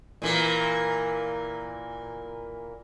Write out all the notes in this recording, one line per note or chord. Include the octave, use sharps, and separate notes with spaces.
A#2 E3 A#3